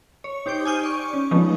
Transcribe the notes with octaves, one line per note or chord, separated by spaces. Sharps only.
C#5
D#4 G4 C5 D6 G6
G#5 D#6 F6 G6 D#7
D5 C#6
C#4
F3 G#3 A3 B3 C#4 D#4